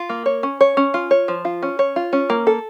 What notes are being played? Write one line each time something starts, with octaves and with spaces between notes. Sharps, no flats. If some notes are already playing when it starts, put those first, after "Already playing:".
Already playing: F4
A#3
C#5
C#4
C#5
C#4
F4
C#5
F3
F4
C#4
C#5
F4
C#4
A#3
A4